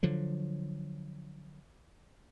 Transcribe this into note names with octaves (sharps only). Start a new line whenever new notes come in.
D3 F3 F#3